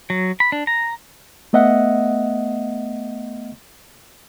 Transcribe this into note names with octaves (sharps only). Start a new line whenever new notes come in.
F#3
B5
D4
A#5
A3 B3 D#5 E5 F#5